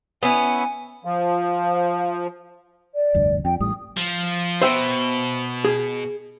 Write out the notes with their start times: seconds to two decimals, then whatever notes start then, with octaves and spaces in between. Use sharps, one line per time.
0.23 B3 C#4 E4 G#5
1.05 F3 F5
2.94 D5
3.15 F1 D2 G2
3.45 F2 G5
3.60 A1 A2 G3 D#6
3.97 F3
4.62 B2 C5 E5 G5
5.65 G#4